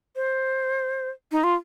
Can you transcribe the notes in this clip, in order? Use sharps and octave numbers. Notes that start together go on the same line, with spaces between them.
C5
D#4
F4